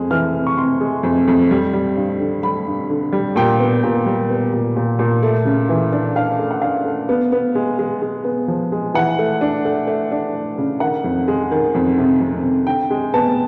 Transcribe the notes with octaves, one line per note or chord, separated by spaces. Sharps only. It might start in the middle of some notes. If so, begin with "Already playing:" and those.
Already playing: F2 G#3
E3 F6
C3
C#6
C3 C6
G#3
F2
F2
G3
G3
G2
D3
G3 B5
G2
D3
G3
A#2 G5
B3
A#2
G3
B3
A#2
A#2
A#2
A3
C#3
E3
D4
D4 F5
A3
F#5
D4 F5
A3
B3
B3
G#3
G#3
G#3
B3
F3
G#3
E3 F#5
A3
D4
A3
A3
D4
A3
C#3
D#3 F#5
F2
G#3
D#3
F2
C3
F2
C3
D3 G5
G#3
B3 A5